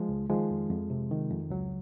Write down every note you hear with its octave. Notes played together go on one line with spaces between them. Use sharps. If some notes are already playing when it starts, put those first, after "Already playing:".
Already playing: F3 G#3
C#2
D#3 F3 G#3
F2
F2
C3
D#3
F2
C#2 F#3